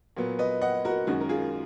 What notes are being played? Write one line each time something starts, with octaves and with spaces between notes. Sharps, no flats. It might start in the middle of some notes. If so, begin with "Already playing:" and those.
A#2 F#3 B3
B4 D#5
D#5 F#5
F#4 A#4
F#2 D#3 G#3 C#4 F#4
A#4
F4 G#4